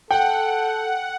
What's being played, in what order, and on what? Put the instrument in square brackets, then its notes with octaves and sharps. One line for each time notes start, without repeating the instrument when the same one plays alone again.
[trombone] A4 [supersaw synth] F#5 [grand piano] G5